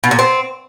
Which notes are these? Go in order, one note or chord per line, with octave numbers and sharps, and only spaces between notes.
B2
A#2
C4